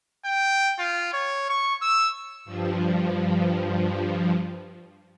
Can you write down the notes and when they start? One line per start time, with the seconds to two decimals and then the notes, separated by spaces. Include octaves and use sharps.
0.25 G5
0.79 F4
1.14 C#5
1.50 C#6
1.82 E6
2.45 G2 F3